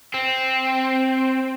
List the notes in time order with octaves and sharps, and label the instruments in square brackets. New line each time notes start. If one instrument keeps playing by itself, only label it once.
[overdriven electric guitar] C4